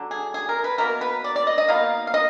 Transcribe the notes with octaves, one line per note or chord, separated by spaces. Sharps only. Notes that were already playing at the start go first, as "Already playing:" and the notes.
Already playing: D3 F#3 D4
G#4
G#4
A#4
B4
B2 F#3 A#3 A#4
B4
D5
D5
D#5
D#5
B2 A#3 D#4 F5
F5
D#5